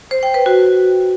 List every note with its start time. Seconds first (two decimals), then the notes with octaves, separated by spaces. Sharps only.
0.11 C5
0.23 G5
0.34 B4
0.46 F#4